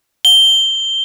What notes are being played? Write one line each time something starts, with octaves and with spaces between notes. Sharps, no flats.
G7